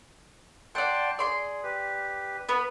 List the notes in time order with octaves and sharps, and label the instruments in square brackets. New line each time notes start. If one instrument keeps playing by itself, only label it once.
[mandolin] D5 F#5 [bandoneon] G5 A5 C6
[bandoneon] G#4 [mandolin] D5 C6
[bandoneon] G4 B4
[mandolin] B3 B4